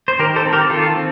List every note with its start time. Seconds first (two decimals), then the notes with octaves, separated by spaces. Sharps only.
0.08 C5
0.19 D#3 G4 A#4
0.36 A4 C5
0.45 C4
0.53 G4 A#4
0.70 D#3 F4 A4
0.96 C4